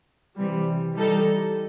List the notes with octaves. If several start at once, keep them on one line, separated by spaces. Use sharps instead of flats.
C3 E3 G3
E3 G3 D#4 A4